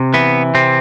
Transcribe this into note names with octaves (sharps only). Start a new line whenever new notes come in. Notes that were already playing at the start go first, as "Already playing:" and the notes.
Already playing: C3
E3 B3
C3 C4